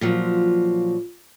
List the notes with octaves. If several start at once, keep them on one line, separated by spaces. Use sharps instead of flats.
A#2 F3 F#3